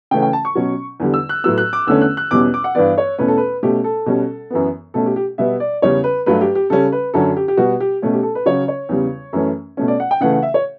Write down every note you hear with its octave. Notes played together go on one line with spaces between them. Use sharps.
C#3 E3 A3 C#4 G5
G5
A5
C#6
B2 F#3 C#4
E2 D3 G3
E6
F#6
A2 F#3 B3 E6
F#6
D6
E2 D3 A3 C#4 E6
F#6
F#6
E2 B2 G3 C#4 D6
D6
F#5
G2 E3 B3 D5
C#5
E2 B2 A3 C#4 B4
A4
B4
B2 A3 C#4 G4
A4
B2 G3 C#4
F#2 E3 B3
B2 A3 C#4 A4
G4
G4
B2 G3 B3 E5
D5
E2 C#3 G3 C#4 C#5
B4
G2 F#3 A3 B4
G4
G4
C#3 G3 C#4 A4
B4
F#2 D3 F#3 C#4 A4
G4
G4
B2 G3 B3 F#4
G4
B2 A3 C#4
G4
A4
B4
C#3 F#3 C#4 C#5
C#5
E2 C#3 G3
F#2 E3 A3 C#4
B2 A3 C#4
D5
F#5
G5
C#3 E3 A3 F#5
F#5
E5
C#5